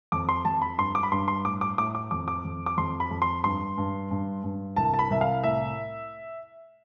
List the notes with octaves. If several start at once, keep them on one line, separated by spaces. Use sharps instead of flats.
F2 D6
C6
F2 A5
B5
G2 C6
D6
B5
G2 C6
C6
A2 D6
D6
A2 D6
D6
F2 D6
D6
F2
D6
F2 C6
B5
F2
C6
G2 C6
G2
G2
G2
C2 A5
A5
B5
C2 E5
F5
A2 E5